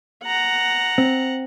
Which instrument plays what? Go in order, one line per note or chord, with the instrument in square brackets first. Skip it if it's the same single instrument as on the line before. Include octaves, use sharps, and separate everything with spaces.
[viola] F#5 A#5
[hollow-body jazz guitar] C4